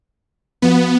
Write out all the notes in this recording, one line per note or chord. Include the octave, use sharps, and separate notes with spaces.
F3 B3 F#4 B4